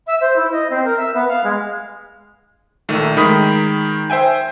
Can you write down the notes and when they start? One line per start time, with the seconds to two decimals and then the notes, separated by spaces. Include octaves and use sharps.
0.07 E5
0.21 C5
0.36 E4
0.52 D#5
0.70 C4
0.85 A#4
0.97 E5
1.14 B3
1.28 F5
1.44 G#3
2.89 A#1 D#3 A3
3.17 D#3 G#3 B5 D#6 B6
4.10 C5 E5 G5 G#5